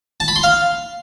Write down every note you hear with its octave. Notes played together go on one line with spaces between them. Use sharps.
A5
B5
C6
F5